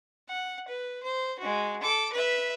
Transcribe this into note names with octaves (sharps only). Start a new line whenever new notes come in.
F#5
B4
C5
G#3 F#4
A4 D6
B4 E5